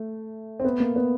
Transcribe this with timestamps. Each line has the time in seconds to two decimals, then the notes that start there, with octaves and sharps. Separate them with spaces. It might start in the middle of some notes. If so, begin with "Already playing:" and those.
Already playing: A3
0.60 C4
0.64 B3
0.80 A#3
0.96 B3